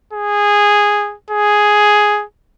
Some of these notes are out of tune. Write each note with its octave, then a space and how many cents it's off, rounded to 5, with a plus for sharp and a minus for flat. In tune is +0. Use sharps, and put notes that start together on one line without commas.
G#4 -10
G#4 +5